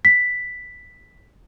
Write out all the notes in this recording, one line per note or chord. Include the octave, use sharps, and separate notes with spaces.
B6